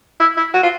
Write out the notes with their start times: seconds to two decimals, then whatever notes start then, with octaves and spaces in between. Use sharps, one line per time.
0.20 E4
0.37 E4
0.54 F#4
0.63 F4